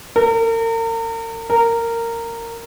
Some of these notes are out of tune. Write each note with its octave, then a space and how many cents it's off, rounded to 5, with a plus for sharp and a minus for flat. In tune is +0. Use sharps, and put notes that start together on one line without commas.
A#4 -40
A#4 -15